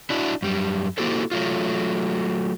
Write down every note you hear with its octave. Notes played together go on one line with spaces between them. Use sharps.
D4 E4 F#4
F#2 G3
A#3 E4 F#4 G4 A4 C5
F#3 A3 F4